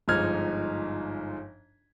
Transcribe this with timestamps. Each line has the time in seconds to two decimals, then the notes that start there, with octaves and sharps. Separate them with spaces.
0.08 G1 G#2 F3 D#4 F6 G#6